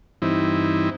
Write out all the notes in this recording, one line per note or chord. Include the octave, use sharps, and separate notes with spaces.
G2 E3 C4 D#4 E4